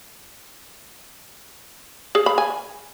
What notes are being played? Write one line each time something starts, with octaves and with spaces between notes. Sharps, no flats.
G#4
B5
G#5